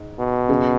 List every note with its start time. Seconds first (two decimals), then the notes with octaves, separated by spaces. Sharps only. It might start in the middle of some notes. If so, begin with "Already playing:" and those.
Already playing: G#2
0.19 B2
0.49 F#2 C#3 B3 G#4 B4